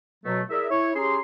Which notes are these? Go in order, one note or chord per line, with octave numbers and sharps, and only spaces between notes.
B2 F#3 A3
E4 G#4 A#4 D5 E5
E4 C#5
C#4 G4 G#4 A#5 C6